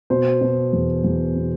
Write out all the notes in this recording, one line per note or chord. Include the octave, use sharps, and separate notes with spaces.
B2 C5
B2
E2
E2
B2